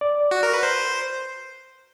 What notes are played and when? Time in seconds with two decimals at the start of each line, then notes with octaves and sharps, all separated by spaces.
0.01 D5
0.31 F#4
0.43 A#4
0.53 B4
0.63 C5